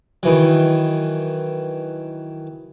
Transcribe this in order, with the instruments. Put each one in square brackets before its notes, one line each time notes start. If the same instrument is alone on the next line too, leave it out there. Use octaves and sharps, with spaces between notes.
[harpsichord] D#3 E3 F#3